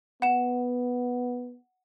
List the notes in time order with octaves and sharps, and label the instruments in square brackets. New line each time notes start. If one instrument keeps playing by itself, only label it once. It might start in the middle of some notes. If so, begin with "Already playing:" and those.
[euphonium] B3 [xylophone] F#5 E7